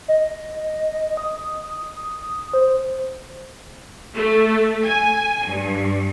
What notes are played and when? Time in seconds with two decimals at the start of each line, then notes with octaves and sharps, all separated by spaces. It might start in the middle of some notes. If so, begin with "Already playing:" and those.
0.08 D#5
1.17 D#6
2.53 C5
4.15 A3
4.85 G#5
5.48 G2